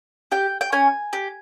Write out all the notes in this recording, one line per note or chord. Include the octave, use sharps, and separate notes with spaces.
G4 G5
G5
C#4 G#5
G4